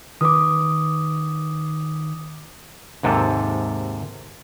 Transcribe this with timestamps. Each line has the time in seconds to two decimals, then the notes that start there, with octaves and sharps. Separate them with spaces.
0.21 D#3 B4 D6 D#6
3.03 D#2 G#2 C3 A4